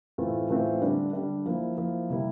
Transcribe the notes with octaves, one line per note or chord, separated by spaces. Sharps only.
A2 E3 A3 C4 F4
A2 E3 A3 C4 F4
D3 G3 D4
D3 G3 D4
F3 A#3 E4
F3 A#3 E4
C3 G3 A#3 E4